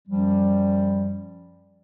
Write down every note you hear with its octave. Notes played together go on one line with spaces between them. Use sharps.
F#2 F3 G3